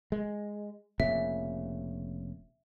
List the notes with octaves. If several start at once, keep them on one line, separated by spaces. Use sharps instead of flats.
G#3
F1 A#2 C#3 E5